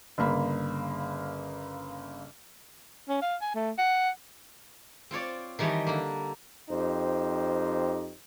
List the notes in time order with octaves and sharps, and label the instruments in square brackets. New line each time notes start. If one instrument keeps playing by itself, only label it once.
[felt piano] G1 C#3 A#3 B5
[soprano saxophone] C#4
F5
G#5
A3
F#5
[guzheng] C4 F4 C#5 D5
D#3 E3 G3 C#5 D#5 A5
D3 A#3
[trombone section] F2 D#4 G4 C5